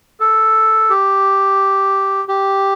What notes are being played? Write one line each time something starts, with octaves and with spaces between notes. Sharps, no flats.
A4
G4
G4